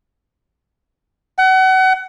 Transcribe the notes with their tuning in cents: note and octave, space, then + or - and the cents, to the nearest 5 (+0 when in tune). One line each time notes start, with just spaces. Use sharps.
F#5 +30